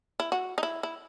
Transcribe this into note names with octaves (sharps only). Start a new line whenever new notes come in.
E4
F#4
D#4
E4
E4